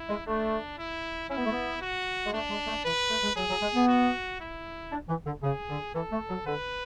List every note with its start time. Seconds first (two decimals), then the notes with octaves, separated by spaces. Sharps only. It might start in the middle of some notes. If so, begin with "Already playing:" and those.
Already playing: E4
0.09 G#3
0.26 A3 D4
0.78 E4
1.29 C#4 E4
1.37 B3
1.45 A3
1.52 B3
1.81 F#4
2.26 G#3
2.33 A3 D4
2.50 G#3
2.67 A3
2.85 E3 B4
3.10 A3
3.23 G#3
3.36 F#3 G#4
3.50 F#3
3.62 G#3
3.75 B3
3.88 F#4
4.40 E4
4.92 D4
5.09 E3
5.26 D3
5.43 C#3 G#4
5.69 D3
5.94 E3 A4
6.12 A3
6.29 F#3
6.46 D3 B4